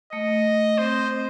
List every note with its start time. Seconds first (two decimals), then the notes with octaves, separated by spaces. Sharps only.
0.12 A3 D#5
0.78 C4 C5